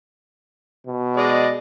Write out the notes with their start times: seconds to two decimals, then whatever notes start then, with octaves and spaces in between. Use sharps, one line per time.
0.87 B2
1.16 G#3 D5 D#5